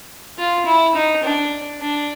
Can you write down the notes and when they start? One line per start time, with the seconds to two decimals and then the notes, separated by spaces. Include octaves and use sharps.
0.38 F4
0.66 E4
0.95 D#4
1.23 D4
1.81 D4